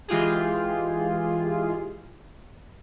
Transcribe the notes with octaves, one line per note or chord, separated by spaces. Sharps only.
E3 G#3 F4 G4 G#4